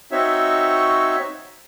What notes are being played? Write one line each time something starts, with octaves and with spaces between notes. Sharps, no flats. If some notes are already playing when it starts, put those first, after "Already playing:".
C4 D#4 F#4 C#5 E5